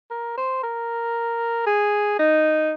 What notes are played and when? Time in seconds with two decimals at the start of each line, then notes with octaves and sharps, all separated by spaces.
0.11 A#4
0.37 C5
0.63 A#4
1.66 G#4
2.19 D#4